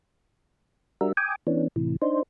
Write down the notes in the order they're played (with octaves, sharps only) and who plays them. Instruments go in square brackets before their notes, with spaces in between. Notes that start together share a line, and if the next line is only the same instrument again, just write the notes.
[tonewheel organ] G3 D4 F#4 A#4 E5
G5 G#5 D6 D#6
E3 B3 C#4 D4
A2 C3 E3
D4 D#4 C5